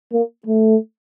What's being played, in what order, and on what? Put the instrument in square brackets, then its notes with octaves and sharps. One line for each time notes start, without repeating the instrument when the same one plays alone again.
[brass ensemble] A#3
A3